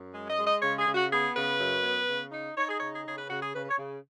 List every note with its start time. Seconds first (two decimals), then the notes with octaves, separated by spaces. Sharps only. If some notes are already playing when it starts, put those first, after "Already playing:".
Already playing: F#2
0.14 G#3
0.30 D#5
0.38 G#3
0.46 D#5
0.62 C#3 C#5
0.78 G#4
0.86 C#3
0.95 F#4
1.11 B3 G#4
1.35 C#3 B4
1.59 F#2
1.84 B3
2.08 C#3
2.32 D#4
2.57 D#4 C#5
2.69 G#4
2.80 C#3 C#5
2.93 G#4
3.06 C#3 G#4
3.17 B4
3.29 C#3 F#4
3.42 G#4
3.54 C#3 B4
3.65 B4
3.69 C#5
3.78 C#3